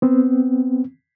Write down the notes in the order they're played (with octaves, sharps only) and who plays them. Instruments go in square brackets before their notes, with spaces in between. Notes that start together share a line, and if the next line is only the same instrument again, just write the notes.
[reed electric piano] B3 C4